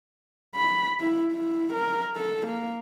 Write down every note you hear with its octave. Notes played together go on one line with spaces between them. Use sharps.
B5
E4
E4
A#4
A4
A#3